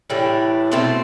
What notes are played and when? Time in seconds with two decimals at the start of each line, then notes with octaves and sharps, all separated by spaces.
0.10 A2 E3 G3 D4
0.72 B2 A3 C4